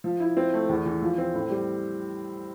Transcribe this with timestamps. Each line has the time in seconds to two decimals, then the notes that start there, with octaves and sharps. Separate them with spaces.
0.04 F3
0.20 E4
0.37 C4
0.53 A3
0.69 E2
0.86 E3
1.02 F3
1.18 C4
1.34 A2
1.50 G3